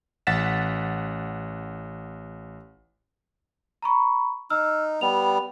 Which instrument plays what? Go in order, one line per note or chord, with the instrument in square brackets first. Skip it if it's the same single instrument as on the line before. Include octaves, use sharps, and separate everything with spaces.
[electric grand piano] A1 F#5 A6 B6 E7
[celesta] A#5 B5 C#6
[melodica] D#4 [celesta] E6 F6
[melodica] G3 B3 [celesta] F7